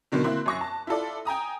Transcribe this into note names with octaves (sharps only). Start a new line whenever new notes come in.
B2 D3 D#3 F#3
A#3 C4 E4 C6 F#6
F#2 C#6 A#6
A5
E4 F4 A4 D5
G5 G#5 A#5 D#6